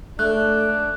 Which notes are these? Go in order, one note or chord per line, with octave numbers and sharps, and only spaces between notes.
A3 D4 F#6